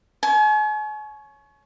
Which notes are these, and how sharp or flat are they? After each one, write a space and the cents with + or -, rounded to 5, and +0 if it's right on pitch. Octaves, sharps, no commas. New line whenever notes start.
C#5 +0 G#5 +40